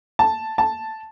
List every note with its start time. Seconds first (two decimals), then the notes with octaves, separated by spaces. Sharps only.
0.19 A5
0.58 A5